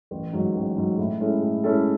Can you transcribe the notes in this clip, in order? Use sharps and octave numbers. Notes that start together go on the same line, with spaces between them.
A1
G#2 F#3
A1
G#2 F#3
A2
G#3 C#4 E4 A4
A2
G#3 C#4 E4 A4